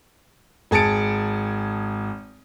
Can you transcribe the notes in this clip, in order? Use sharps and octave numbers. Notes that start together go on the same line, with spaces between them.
G#1 G#4 A5 A6 C#7 D7